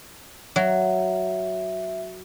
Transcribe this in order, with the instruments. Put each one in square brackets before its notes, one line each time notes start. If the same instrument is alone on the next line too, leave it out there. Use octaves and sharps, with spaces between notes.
[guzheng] F#3 [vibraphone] E5